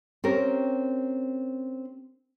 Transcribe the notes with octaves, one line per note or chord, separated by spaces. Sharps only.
C4 C#4 G4 A#4